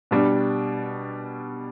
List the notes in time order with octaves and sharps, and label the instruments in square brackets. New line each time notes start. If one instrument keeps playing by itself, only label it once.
[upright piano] B2 G3 D4